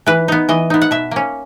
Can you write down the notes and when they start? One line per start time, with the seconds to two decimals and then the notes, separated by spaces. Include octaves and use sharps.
0.06 E3 B4
0.28 B3 D#4
0.49 E3 D#5
0.70 B3 D#4
0.82 F#5
0.91 B2 E5
1.11 A#3 C#4